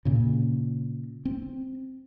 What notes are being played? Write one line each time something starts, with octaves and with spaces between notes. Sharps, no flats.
A#2 C#3
C4